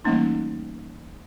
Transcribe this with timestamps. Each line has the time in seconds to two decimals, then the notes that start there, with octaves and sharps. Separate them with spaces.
0.05 E3 G3 A3 A#3 C#4 D#4